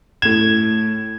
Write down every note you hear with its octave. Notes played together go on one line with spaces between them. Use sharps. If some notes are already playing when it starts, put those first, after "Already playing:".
A2 G#6 E7